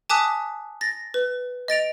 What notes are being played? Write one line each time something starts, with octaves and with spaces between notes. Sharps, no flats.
G#5 A5 D6 D#6 F#6 B6
A6 A#6
B4
D#5 A6 D7 F7